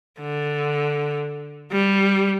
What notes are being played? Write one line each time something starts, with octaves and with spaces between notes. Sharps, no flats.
D3
G3